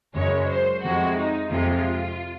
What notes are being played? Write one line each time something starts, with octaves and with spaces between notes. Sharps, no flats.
F#2 C#3 G#3 C#5
C5
F2 C3 F3 G#3 F#4
D#4
F2 C3 F3 G#3 F4